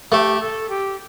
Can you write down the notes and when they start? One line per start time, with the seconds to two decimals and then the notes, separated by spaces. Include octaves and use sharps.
0.12 A3 G4
0.41 A4
0.70 G4